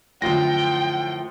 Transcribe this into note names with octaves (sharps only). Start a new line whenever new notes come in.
F#2 A2 D3 F3 A3 F4 G5 A#6